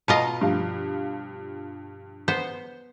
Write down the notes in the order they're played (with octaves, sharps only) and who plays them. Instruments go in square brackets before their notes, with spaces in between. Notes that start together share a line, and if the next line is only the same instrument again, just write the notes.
[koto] B2 F4 D#5 [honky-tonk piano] A#5 B5
[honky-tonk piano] G2 F3 F5
[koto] B3 C5